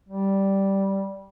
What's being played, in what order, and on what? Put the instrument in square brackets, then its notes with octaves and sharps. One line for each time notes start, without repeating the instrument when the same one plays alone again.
[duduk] G3